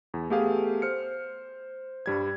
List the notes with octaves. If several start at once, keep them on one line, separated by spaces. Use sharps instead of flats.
E2
A3 B3 G4 G#4 F5
C5 F6 C#7
G2 G3 G#6